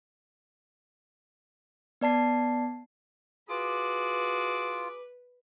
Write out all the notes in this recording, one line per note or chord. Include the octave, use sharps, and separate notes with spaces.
B3 D5 A5 C7
F4 F#4 G#4 B4 D6